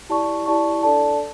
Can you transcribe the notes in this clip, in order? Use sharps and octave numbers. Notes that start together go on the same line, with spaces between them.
E4 G4 D5 A5 C#6
E4 G4 D5 A5 C#6
D4 A4 D5 A5